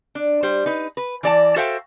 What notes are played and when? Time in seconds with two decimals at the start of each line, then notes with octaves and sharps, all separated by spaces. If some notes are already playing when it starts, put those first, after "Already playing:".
0.15 D4
0.43 G3 G4 C5
0.66 D#4 B4
0.97 B4
1.23 E3 D5 A5
1.56 F#4 A4 C5 E5 F5 G5